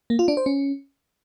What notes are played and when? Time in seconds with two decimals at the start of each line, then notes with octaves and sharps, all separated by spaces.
0.10 A#3
0.19 F4
0.28 D4
0.37 C5
0.46 C#4